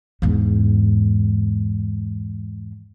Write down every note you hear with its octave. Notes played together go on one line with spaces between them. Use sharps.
E2 G#2